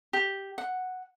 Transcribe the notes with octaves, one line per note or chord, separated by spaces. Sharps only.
G4
F#5